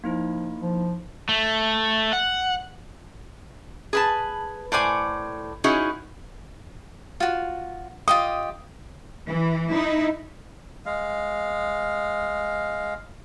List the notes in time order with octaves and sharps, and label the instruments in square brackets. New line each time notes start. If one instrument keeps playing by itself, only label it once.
[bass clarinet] F3 [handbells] A#3 D#4 E4
[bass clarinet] F3
[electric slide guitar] A3
F#5
[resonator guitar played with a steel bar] G#4 B4 A5
A2 C5 D5 G#5
C#4 D#4 E4 F#4 G#4
[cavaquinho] F4 F#4
[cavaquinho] F4 G4 D#5 [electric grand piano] D#6
[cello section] E3
D#4 E4
[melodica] G#3 F5